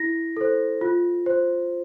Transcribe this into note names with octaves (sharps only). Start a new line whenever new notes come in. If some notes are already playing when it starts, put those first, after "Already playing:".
Already playing: E4 A#6
A4 C5
F4
C5